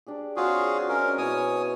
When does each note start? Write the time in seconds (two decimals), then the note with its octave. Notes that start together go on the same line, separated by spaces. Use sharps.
0.07 D4 G4 G#4
0.37 F#3 C4 F4 F#4 G#4
0.89 C#4 A#4 D5 D#5
1.18 B2 C#4 E4 C#5 G#5 D#6